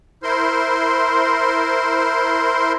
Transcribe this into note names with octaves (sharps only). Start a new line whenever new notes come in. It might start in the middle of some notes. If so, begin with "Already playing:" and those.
E4 A#4 C5 C6